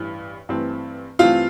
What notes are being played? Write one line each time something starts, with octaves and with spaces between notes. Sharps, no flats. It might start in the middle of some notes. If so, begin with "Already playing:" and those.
Already playing: A1 G2 E3
G2 E3 A3 C4
G2 E3 A3 C4 F4 F5